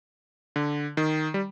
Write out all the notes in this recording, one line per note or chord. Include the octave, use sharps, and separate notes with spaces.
D3
D#3
G3